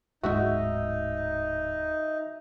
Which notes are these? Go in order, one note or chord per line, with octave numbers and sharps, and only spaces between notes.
D1 G#2 G#3 D#4 F#4 E5